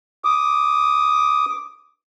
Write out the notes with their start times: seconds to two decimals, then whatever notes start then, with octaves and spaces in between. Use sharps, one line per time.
0.25 D6 D#6